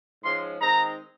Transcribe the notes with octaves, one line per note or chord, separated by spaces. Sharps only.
G#2 F3 G#3 C#4 C6
D#3 G#3 C4 D#4 A#5